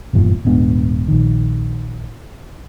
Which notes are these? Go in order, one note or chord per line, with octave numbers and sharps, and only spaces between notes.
F1 E2 G2 A#2
D#1 G#2 B3 D4
A#1 D#3